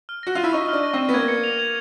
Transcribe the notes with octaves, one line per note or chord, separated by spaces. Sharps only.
F6
F#4 A#6
F4 D#7
E4
D#4 C#6
D4 F6
A#6
C4 D#7
B3
A#3 G#6
C#7
F7
G#6